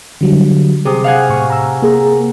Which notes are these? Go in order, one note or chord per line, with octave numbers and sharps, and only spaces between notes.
D3 F#3 G3
C3 G#4 D#6
F5 F#5 G#5
A2 C#6
A#5 E6
A#3 G#4 A#5